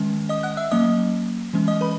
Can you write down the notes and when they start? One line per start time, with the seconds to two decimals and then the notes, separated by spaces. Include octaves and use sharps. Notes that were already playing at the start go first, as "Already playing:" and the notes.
Already playing: D#3 G#3 C#4
0.29 D#5 D#6
0.43 F#5 F#6
0.57 E5 E6
0.71 F#3 A#3 C#4 D#5 D#6
1.54 E3 G#3 C#4
1.68 D#5 D#6
1.81 B4 B5